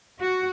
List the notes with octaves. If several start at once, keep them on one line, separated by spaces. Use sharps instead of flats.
F#4